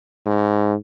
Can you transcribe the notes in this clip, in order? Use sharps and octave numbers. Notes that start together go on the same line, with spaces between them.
G#2